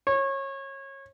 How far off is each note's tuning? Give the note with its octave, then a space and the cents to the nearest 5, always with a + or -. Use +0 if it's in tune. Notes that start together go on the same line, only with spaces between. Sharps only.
C#5 -25